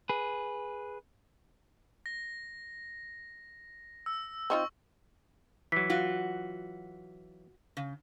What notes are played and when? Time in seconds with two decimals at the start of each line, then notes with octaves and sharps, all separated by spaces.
0.09 G#4 B4
2.06 A#6
4.06 E6
4.50 C4 D#4 F4 C#6
5.72 E3 F#3 B6
5.90 F4 F#4
7.77 C#3